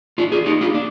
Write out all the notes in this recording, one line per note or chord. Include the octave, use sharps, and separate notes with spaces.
D4 F4
F4 G#4
D#4 G4
D4 F4
D4